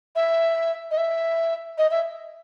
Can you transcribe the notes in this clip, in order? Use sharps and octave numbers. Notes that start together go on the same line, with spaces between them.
E5
D#5
E5
D#5
E5